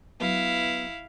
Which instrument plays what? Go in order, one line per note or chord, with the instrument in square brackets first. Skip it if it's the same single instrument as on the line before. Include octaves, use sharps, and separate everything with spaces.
[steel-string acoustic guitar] F#3 B3 [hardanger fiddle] E4 F5